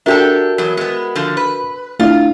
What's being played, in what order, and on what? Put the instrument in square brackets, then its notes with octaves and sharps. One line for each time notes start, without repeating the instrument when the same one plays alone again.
[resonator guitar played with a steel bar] D4 G4 A4 [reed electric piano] F#4 A#4 E5
[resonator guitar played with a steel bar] E2 F#3
G#3 B3
D3 F3
B4
[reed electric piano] A3 D4 E4 [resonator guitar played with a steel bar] F4